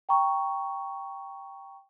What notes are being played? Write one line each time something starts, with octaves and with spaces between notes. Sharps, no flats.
G5 A#5 C#6